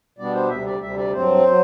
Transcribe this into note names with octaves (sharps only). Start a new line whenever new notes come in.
B2 G3 B3 D4 D5
C5
D2 C3 G3 E5
D5
D2 C3 G3 E5
D5
G2 F#3 C4 C5
F#3